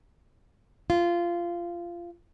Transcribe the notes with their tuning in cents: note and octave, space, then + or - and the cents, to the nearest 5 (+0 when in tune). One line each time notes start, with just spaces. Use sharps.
F4 -15